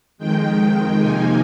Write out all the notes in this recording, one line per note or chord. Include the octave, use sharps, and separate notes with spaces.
F2 D#3 G#3 G5
C3 F3 A#3 D#4 G#5